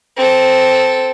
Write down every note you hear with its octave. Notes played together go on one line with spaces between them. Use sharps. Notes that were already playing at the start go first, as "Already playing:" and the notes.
C4 A4